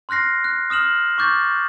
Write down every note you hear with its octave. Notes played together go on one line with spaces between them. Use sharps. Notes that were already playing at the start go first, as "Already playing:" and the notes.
C6 F6 F#6 A#6 C7
F#6
D#6 F6 E7 F#7
C#6 D6 G6 A6